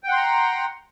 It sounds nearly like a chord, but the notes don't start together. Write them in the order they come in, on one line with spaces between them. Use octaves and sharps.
G5 F#5 C6 A#5